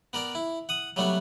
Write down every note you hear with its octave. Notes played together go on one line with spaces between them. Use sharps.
B3 A#4 D5 G5
E4
F#5 D#6
F#3 G3 A3 B3 D4 F#5